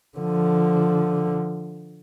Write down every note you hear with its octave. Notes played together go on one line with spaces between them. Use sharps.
D3 F3